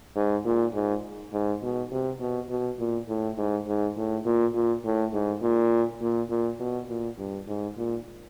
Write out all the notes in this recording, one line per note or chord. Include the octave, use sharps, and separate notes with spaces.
G#2
A#2
G#2
G#2
B2
C3
B2
B2
A#2
A2
G#2
G#2
A2
A#2
A#2
A2
G#2
A#2
A#2
A#2
B2
A#2
G2
G#2
A#2